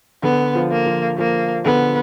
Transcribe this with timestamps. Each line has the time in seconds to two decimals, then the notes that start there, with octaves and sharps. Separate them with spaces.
0.23 D3 B3
0.55 F3
0.71 A#3
0.86 F3
1.18 F3 A#3
1.65 D3 B3